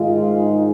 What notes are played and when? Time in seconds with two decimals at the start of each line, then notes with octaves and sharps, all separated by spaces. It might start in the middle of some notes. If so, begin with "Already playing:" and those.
Already playing: G#2 D#3 G#3 F4
0.39 D#4